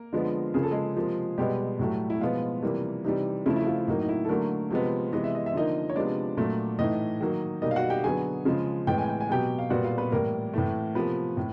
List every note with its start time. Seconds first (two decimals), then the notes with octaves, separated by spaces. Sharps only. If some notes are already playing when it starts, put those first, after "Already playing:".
Already playing: A#3 A#4
0.13 D3 F3 G#3 B3
0.54 C#3 F3 A#3 G#4
0.63 A4
0.71 G#3 G#4
0.96 C3 F3 A#3
1.38 B2 G3 G#3 B3 G4
1.79 A2 F#3 A3
2.10 E4
2.21 B2 F3 G#3 B3 F4
2.62 C3 E3 G3 A#3
3.04 C3 E3 G3 D#4
3.46 C#3 F3 A3 E4
3.56 E4
3.66 F3 F4
3.77 E4
3.88 A2 F#3 A#3 D#4
4.01 D#4
4.09 E4
4.25 A4
4.29 D3 F#3 A3 A#3 A#4
4.71 C3 F3 G#3 B3
5.13 C3 E3 G#3 B3 D#5
5.24 E5
5.35 D#5
5.46 E5
5.54 D3 F3 A#3 D#4 D#5
5.90 C#5
5.96 C3 F3 G#3 B3 D4 D5
6.37 A#2 F#3 A3
6.79 A2 E3 A3 D#4 D#5
7.21 D#3 F#3 A#3
7.62 B2 G3 A#3 D#4 D#5
7.71 F5
7.76 F#4 F#5
7.90 G4 G5
8.04 D3 F#3 B3 G#4 G#5
8.45 C#3 F3 G#3
8.87 A2 E3 G#3 B3 G5
8.98 G#5
9.09 G5
9.21 G#5
9.29 B2 F#3 B3 G4 G5
9.59 F5
9.70 A#2 G3 B3 F#4 F#5
9.84 F4 F5
9.98 B3 B4
10.12 A2 E3 G3 A#3 A#4
10.54 A2 E3 A3
10.95 C3 F3 A#3 B3 B4
11.37 A2